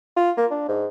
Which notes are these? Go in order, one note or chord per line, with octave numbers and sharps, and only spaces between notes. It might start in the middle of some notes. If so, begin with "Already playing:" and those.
F4
A#3
D4
G#2